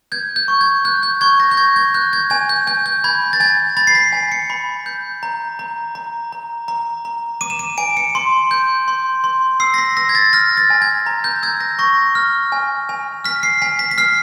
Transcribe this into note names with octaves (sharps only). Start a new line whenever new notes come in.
G6 G#6
G6
C#6
G#6
F#6 G6
G6
C#6 G#6
A#6
G6
C#6 G#6
G#6
F#6 G6
G#6
G#5 G#6
G6
G#5 G6
G6
B5 G#6
A6
G#5 G#6
B5 A6
C7
B6
G#5
C#7
B5
G6
A#5
A#5
A#5
A#5
A#5
A#5
D6 D#7
E7
D#7
G#5 D7
C#7
C6
G6
C6
C6
E6 C7
A#6
B6
E6 A#6
G#6
A6
F6 A#6
A6
G#5
G#6
A#5
G6
E6 G#6
A#6
C#6 A#6
F6
G#5
G#5
F6 B6
C7
G#5 B6
B6
B6
F6 C7